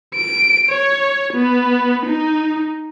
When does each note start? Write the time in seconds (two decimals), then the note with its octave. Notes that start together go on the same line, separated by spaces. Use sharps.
0.15 D7
0.69 C#5
1.33 B3
2.06 D#4